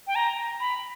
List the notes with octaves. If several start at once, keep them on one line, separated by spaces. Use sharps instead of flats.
G5
A#5
B5